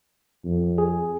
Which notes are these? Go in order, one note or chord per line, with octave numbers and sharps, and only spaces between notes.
F2
G#4